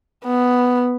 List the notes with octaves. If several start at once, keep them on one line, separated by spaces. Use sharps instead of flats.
B3